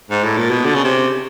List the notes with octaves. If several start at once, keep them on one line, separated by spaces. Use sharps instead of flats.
G#2
A2
A#2
B2
D3
C#3
C3